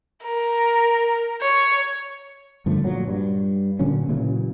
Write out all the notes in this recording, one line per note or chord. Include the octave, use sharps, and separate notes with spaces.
A#4
C#5
G2 D3 F3 A3
A#2 F3 F#3
G2
A#2 D3 F#3 C#4
A#2 C#3 E3 F#3